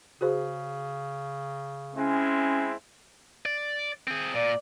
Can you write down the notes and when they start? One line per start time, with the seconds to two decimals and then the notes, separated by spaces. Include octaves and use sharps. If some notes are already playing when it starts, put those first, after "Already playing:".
0.21 C#3 F#4 G#4 C5
1.95 G#3 C4 C#4 E4
3.46 D5
4.07 C4 G#4
4.35 A#2 D5